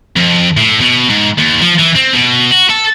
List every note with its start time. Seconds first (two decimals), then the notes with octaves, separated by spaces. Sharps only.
0.16 F2
0.57 A2
0.81 B2
1.10 G#2
1.38 D#2
1.61 F3
1.79 E3
1.95 C4
2.13 B2
2.52 F#4
2.70 A4